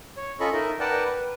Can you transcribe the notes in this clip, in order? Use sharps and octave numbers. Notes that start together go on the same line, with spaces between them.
C#5
C#4 F4 A4 D#5 B5 C#6
D#4 A#4 D#5 E5
A#4 B4 D5 F#5 G5 A5
B4